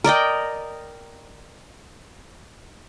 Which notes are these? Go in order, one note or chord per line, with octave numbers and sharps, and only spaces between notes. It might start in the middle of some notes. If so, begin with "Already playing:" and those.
A#4 D5 D#5 G5